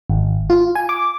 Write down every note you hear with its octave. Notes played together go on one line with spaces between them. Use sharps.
G#1
F4
G#5
D6